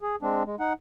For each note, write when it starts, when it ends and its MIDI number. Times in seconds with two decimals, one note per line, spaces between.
0.01 0.16 68
0.22 0.43 56
0.22 0.43 60
0.22 0.43 62
0.46 0.56 56
0.60 0.73 63
0.60 0.73 78